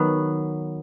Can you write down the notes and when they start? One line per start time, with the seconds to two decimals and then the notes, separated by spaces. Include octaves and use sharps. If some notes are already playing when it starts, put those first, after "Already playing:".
Already playing: D#3 F#3 B3 B4